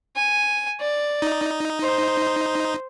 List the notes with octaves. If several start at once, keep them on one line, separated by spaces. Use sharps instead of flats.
G#5
D5
D#4
C5